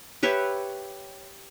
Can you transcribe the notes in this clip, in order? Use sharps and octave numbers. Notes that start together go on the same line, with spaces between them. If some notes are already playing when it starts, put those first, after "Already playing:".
G4 B4 C#5 E5